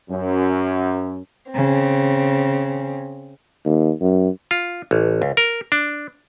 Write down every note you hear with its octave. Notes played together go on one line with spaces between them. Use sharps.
F#2
C#3 C4
D#2
F#2
F4
A1
C#2
A#4
D4